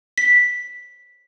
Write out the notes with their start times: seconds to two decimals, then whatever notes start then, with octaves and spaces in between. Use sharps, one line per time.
0.18 B6